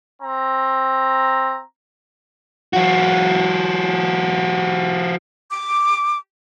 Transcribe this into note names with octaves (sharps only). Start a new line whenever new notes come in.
C4 A#5
F3 F#4
D6